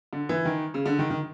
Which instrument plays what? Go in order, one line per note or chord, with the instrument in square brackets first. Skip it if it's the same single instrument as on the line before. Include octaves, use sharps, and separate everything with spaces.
[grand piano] D3
E3
D#3
C#3
D3
D#3
D#3